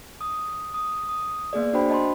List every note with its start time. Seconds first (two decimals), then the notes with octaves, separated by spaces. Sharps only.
0.21 D#6
0.74 D#6
1.09 D#6
1.53 A#3 B3 G#4 D5
1.73 D4 F#4 C5 G5 B5
1.90 D#5 A5 B5 C6